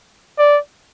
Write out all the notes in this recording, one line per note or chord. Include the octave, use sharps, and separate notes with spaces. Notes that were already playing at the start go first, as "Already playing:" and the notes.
D5